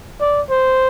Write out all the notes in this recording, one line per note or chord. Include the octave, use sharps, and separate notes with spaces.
D5
C5